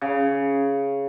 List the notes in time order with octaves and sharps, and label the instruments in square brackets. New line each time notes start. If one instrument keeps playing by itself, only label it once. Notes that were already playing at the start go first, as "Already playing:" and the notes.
[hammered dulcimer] C#3